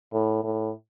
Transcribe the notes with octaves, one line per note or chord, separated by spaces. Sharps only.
A2
A2